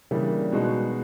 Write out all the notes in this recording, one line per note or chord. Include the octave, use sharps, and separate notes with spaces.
C#3 E3 G3 A#3 D4
B2 G#3 B3 D#4 F#4